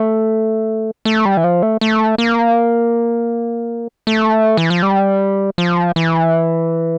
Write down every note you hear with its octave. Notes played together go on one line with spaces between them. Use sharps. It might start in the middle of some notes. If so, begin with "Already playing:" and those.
Already playing: A3
A3
G3
E3
F3
A3
A3
A#3
A3
E3
F3
G3
F3
E3